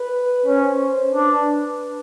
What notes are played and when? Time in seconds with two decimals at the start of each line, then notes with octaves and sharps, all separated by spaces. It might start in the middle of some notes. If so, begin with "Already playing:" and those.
Already playing: B4
0.46 C#4 C5
1.13 D4 B4